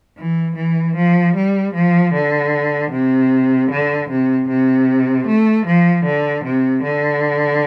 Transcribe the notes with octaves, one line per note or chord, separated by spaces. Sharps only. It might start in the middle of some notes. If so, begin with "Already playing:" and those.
E3
E3
F3
G3
F3
D3
C3
D3
C3
C3
A3
F3
D3
C3
D3